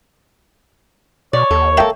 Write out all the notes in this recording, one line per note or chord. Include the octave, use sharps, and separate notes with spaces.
B2 C#5 D5
D#2 A4
A#3 A4 E5 G5